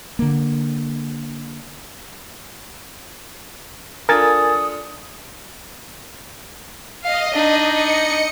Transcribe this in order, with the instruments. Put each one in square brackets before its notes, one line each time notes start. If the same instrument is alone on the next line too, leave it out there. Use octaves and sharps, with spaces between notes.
[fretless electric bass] D3 A#3
[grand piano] D4 F4 A4 [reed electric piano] A#4 G#5 A6 [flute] D#6
[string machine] D#5 [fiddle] F5
[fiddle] D4 D#4
[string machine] D#5 C#7